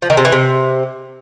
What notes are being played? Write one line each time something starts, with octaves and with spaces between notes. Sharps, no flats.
F3
D#3
C3
E3
C3